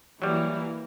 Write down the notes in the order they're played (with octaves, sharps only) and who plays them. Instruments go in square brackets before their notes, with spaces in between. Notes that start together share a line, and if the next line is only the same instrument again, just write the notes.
[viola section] E3 A#3 E4 [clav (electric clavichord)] F#3 G3